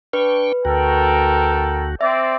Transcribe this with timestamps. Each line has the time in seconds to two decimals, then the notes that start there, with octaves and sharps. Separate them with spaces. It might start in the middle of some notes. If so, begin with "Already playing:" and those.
0.13 D4 B4 G5 C#6
0.65 D2 F#4 A4 A#4 G5
2.01 C4 D5 E5